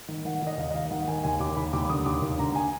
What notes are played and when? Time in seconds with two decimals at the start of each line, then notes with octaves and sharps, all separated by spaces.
0.08 D#3
0.25 D#3 F#5
0.42 D#3 D#5
0.57 D#2 F5
0.71 D#5
0.74 D#3 F5
0.91 D#3 F#5
1.08 D#3 G#5
1.24 D#2 G#5
1.40 D#2 D6
1.56 D#2 B5
1.73 D#2 D6
1.89 D3 D#6
2.06 D#2 D6
2.22 D#2
2.38 D3 A#5
2.55 G#5